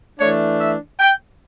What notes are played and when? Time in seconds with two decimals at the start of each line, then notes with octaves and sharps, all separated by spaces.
0.20 E3 A3 D4 C#5
0.60 E5
1.00 G5